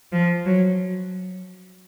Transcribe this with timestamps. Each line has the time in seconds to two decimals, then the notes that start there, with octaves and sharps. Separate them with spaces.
0.12 F3
0.46 F#3